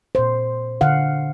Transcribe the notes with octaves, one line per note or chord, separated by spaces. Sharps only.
A#2 C5
D3 F5 F#5